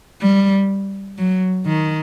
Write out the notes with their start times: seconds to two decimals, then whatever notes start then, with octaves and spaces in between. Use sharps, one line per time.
0.21 G3
1.18 F#3
1.66 D#3